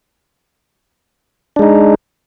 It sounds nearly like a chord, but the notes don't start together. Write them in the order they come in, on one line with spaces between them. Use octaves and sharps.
D4 G#3 D#4